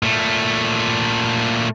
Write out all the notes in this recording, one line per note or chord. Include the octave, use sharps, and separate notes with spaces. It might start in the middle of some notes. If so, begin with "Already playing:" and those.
A#2 A3